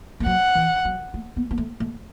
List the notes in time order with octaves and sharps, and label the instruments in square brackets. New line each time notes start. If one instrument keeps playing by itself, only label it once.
[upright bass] A3
[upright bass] F#3 [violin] F#5
[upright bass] E3
F#3
A3
B3
B3
A3
A3